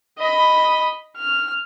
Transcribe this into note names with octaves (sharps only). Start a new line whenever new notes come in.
D#5 B5
F6